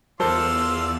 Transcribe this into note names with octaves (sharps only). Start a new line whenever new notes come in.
E2 F4 A4 A#4 C5 D5 C6 E6